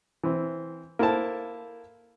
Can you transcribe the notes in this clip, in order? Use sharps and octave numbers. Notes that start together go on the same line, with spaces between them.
E3 C4
A#3 E4 A4 C5 A5